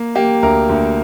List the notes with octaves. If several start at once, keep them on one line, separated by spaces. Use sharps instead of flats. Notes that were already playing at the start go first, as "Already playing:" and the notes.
Already playing: A#3
A#3 G4
D2 A#4
D2